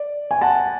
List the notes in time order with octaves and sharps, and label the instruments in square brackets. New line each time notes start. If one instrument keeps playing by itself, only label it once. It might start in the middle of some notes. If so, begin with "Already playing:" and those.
Already playing: [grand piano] D5
G#5
F#5 A5